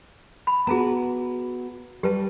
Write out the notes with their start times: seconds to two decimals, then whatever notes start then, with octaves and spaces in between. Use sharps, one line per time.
0.47 B5
0.67 B3 F#4 G#4 A5 A#5
2.03 G3 G4 B4 A5